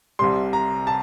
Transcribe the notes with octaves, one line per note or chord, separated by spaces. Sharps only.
C2 C3 G3 C6
A#5
A5